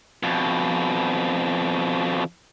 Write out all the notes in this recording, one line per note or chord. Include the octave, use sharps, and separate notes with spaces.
F2 B2